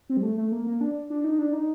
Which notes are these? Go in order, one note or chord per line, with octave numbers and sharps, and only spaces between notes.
C4
G3
A3
A3
A#3
A#3
D4
D4
D#4
D4
D#4